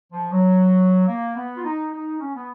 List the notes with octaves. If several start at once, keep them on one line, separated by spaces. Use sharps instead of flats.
F3
F#3
A#3
B3
F4
D#4
D#4
C#4
B3